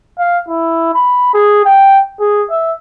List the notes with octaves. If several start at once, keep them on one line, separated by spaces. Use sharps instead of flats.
F5
E4
B5
G#4
G5
G#4
E5